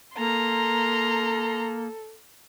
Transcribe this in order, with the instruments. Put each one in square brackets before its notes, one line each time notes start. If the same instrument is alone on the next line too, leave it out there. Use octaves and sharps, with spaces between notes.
[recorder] A#3 [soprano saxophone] A4 [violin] A#5 C6